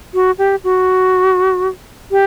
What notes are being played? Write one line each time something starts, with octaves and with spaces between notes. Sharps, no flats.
F#4
G4
F#4
G4